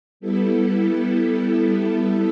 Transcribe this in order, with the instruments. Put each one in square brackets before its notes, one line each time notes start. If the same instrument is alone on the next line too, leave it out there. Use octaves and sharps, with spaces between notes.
[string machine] G3 B3 E4 A4